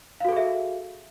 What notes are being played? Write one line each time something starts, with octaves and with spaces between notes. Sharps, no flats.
F#4 G#4 A4 E5 F5